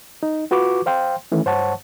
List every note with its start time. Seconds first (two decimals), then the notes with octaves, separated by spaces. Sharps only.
0.23 D#4
0.51 F4 F#4 B4 C#6 D6
0.86 C5 F5 G5 C6
1.32 D#3 E3 A3 C#4
1.46 G2 C5 C#5 F#5 A5 C#6